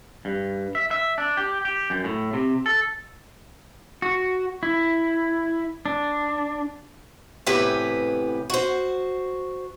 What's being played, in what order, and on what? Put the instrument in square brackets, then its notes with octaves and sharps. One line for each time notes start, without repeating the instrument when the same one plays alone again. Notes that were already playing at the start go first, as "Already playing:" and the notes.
[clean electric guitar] G2
E5
E5
D4
G4
G4
F#2
A2
C3
A4
[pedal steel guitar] F#4
E4
D4
[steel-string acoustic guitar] A2 C3 E3 B3 G4 B4
F#4 C5